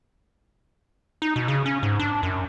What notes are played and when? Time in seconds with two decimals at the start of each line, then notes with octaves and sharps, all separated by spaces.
1.22 D#4
1.36 B2
1.48 C#3
1.66 C#4
1.83 G#2
2.00 D4
2.23 F#2